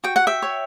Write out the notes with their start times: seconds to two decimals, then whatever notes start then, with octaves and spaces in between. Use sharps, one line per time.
0.04 F#4 G5
0.16 F#5
0.27 E5 G5
0.42 C#5